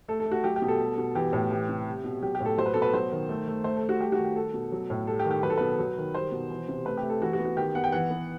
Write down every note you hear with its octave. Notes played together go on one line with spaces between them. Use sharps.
A3 A4
A4
A3
F#4
F#3 G4
G4
B2
A4
G3
B2
E3 G4
A2
E3 G4
C3
G3
B2
F#3 G4
G4
A2
A4
F#3 C5
B4
B2 A4
B4
F#3 C5
D#3
A3
A3
A3 C5
A4
A3
F#4
G3 G4
F#4
D#3
G4
G3 A4
B2
F#3
A2
G3 A4
G4
D#3
G4
F#3 B4
A4
B2 B4
F#3
D#3
G3 C5
B2
E3
C3
A3 B4
G4
A3
A4
E3 F#4
F#4
B3
F#4
D#3 G4
B3 F#5
G5
E3 F#5
B3